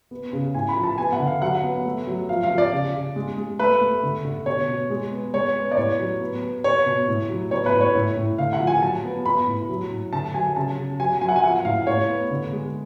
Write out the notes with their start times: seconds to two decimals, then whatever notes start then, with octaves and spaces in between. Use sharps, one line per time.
0.11 B3
0.33 C#3
0.55 A2 G#5
0.68 B5
0.77 F3
0.84 A5
0.98 B3 G#5
1.12 F#5
1.20 D3
1.27 F5
1.42 F#3 F#5
1.63 B3
1.85 A3
2.07 F#3
2.29 F3 F5
2.43 F5
2.51 F3
2.58 D5
2.72 C#3
2.94 C#3
3.16 G#3
3.37 G#3
3.59 A3 B4
3.81 A3
4.03 D3
4.25 D3
4.46 B2 C#5
4.68 B2
4.90 G#3
5.11 B3
5.34 G#3 C#5
5.56 B3
5.71 D5
5.77 A2 C#5
5.99 F#3
6.21 B3
6.42 B3
6.64 B3 C#5
6.86 B2
7.08 A2
7.30 F#3
7.51 B3 C#5
7.66 B4
7.73 A2
7.81 C#5
7.95 A2
8.17 A2
8.38 D3 F5
8.53 F#5
8.60 F3
8.67 G#5
8.82 F#3 A5
9.04 B3
9.26 B3 B5
9.47 A2
9.69 F#3
9.91 A2
10.13 D3 A5
10.34 F#3 G#5
10.56 C#3 A5
10.78 C#3
11.00 F#3 G#5
11.21 F#3 G#5
11.29 F#5
11.36 G#5
11.43 F3 F#5
11.65 A2 F5
11.87 A2 C#5
12.08 B3
12.30 D3
12.52 G#3